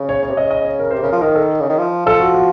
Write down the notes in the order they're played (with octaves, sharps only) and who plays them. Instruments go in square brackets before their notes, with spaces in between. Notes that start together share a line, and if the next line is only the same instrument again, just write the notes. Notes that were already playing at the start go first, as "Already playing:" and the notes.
Already playing: [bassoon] C#3
[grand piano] C#5
C#5
[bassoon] C3
[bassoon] C#3 [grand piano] D#5
[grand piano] D#5
C#5
A#4
[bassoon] C3 [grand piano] C5
[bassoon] C#3 [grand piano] A#4
[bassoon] F3
[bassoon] D#3 [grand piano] A#4
[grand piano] A4
[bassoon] C#3
D#3
F3
[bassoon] F3 [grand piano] A4
[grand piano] F#4
F#4